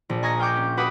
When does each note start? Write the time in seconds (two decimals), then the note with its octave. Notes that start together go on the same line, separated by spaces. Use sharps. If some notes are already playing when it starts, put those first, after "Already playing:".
0.10 A#1
0.22 D#5 G#5 A#5 C#6 G#6 A#6
0.39 F5 G5 C#6 D6 G6
0.57 C#4
0.77 F#4 B4 F#5 B5 D6 D#6